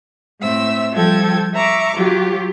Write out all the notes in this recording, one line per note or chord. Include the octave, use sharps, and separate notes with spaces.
A2 C4 E5 E6
F3 G3 A4 G5 G#6
E5 A#5 C#6 D6
F#3 F4 G4